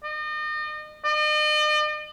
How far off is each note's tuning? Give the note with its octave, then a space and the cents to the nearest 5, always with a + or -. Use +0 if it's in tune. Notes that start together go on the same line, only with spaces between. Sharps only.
D#5 -40
D#5 -45